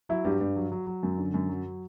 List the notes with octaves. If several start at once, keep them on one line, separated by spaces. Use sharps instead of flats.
F#3 E4
G2 G4
G2
F#3
F#3
F#3
F#2
D3
F#2
F#3